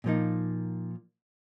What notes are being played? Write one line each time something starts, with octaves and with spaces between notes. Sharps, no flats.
A#2 F3 A#3 D#4